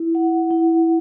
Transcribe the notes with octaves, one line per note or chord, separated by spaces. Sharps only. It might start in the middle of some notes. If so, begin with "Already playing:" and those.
Already playing: E4
F#5
E4